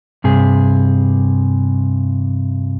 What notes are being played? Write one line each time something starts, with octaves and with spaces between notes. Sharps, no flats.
G2 C3 G#4